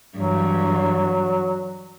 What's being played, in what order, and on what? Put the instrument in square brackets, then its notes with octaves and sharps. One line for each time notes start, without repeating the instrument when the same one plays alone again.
[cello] G2 E3 [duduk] F#3